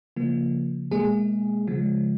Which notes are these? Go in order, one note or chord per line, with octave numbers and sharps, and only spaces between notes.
C#3 F3 A#3
B2 G#3 A#3 G#4
C#3 F3 G#3